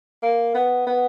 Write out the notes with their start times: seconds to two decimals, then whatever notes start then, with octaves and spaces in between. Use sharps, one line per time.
0.23 A#3
0.54 B3
0.87 B3